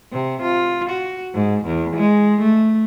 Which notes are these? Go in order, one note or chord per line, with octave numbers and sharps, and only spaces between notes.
C3
F4
F#4
G#2
E2
G#3
A3